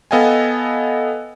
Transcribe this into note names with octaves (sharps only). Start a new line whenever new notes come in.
B3 A4 D#5 F5 G5 G#5